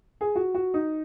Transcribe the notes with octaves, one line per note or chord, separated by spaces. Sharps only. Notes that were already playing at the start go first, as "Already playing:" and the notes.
G#4
F#4
F#4
D#4